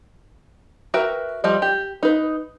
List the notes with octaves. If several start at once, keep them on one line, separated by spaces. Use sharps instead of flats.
F#4 A#4 B4 E5 G5
F3 G3 D#5
G4
D#4 B4